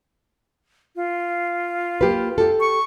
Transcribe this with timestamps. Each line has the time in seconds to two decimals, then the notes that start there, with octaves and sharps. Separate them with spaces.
0.96 F4
2.01 A#3 G4 B4
2.38 G4 A4
2.60 C#6